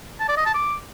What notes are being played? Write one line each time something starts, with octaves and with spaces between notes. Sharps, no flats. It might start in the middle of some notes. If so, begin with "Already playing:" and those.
A5
D5
D#5
A5
D6